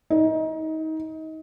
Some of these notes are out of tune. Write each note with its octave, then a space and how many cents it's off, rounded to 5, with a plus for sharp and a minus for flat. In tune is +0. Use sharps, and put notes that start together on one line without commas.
D#4 +25